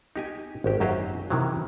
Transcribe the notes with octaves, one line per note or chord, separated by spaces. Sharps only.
D#4 G4 G#5
G#1 G4
F#2 F#3 G4 C5 D#5 F5
C3 D#3 E3 F#3